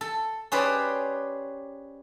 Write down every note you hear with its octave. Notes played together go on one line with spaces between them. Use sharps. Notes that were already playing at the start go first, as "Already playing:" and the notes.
A4
C#4 G4 G#4 B4 C5 D5